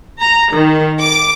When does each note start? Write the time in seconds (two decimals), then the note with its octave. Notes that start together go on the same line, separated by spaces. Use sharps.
0.19 A#5
0.50 D#3
1.00 D6